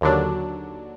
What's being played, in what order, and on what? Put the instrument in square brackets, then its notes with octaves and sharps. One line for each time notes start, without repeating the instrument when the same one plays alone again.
[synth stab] D#2 D3 F#3 D4